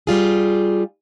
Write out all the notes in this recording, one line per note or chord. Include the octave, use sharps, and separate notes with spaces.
G3 F4 G#4